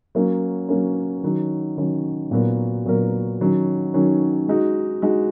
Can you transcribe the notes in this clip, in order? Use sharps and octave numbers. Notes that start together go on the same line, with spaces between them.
F#3 A#3 C#4
F#3 A#3 C#4
D#3 F#3 C#4
D#3 F#3 C#4
A#2 F#3 B3 F#4 A#4
A#2 F#3 B3 F#4 A#4
D#3 F#3 C#4
D#3 F#3 C#4
G#3 D#4 F#4
G#3 D#4 F#4